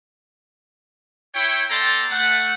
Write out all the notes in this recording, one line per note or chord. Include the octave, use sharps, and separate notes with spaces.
E4 C#5 G5
B3 A4 D5 G5 A#5 C6
A3 F#5